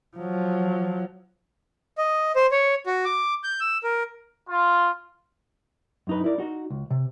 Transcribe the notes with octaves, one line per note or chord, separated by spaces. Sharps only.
F3 F#3
D#5
C5
C#5
F#4
D6
G6
E6
A#4
F4
F#2 D#4 B4
E4 A#4 D5
D#4 F#4
C#2
C3